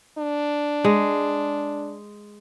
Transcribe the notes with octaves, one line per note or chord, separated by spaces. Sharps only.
D4
G#3